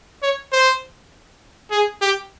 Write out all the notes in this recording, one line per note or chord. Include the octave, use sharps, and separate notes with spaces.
C#5
C5
G#4
G4